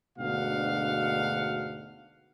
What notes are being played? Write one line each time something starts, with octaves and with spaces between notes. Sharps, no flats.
D2 G#2 B2 D4 F5 F#5